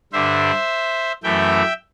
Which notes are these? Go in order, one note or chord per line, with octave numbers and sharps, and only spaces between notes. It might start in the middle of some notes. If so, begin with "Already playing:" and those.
G2 D3 G3 C5 E5
F#2 E3 A3 E5 G5